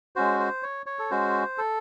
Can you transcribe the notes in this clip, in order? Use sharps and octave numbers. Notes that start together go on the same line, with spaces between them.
G#3 C#4 F#4 C5
C5
C#5
C#5
A4
G#3 C#4 F#4 C5
A4